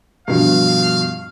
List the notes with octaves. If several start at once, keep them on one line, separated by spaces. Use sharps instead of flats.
G2 B2 F3 F5